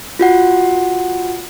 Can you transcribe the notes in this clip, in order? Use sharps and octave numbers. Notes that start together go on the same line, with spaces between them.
F4 F#4 F#5